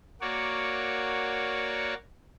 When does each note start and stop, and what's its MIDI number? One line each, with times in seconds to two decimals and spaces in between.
0.21 1.94 58
0.21 1.94 66
0.21 1.94 73
0.21 1.94 74